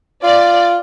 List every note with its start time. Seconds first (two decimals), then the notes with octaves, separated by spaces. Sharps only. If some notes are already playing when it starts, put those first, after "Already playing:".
0.23 F4 D5